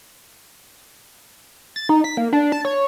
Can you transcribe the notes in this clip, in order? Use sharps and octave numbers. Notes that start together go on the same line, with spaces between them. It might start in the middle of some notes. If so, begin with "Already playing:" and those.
A6
D#4
B6
A#3
D4
A5
C#5